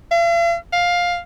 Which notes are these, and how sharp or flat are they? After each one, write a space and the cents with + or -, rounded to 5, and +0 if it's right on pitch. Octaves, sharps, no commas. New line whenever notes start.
F5 -45
F5 +10